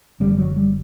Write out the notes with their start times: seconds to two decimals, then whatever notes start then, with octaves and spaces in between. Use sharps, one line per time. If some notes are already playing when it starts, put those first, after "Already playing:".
0.20 F#1 F#2 D3 G3
0.32 G3
0.39 F#3
0.56 G3